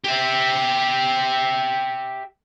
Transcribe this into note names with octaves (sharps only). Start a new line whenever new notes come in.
G4 E5